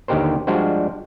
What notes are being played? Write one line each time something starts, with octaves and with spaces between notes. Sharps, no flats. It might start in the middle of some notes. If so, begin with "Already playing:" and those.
D#2 D3 D#4 G4 A#4 C5
F3 G3 G#3 D4 F#4 C5